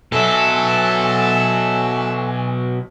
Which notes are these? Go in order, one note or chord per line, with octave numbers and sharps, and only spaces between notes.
B2 F#3 A4 E5 G#5